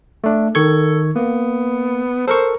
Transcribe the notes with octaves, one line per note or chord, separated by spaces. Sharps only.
A3 D4
D#3 A4 C#6 G#6
A#3 B3
A4 A#4 C5 C#6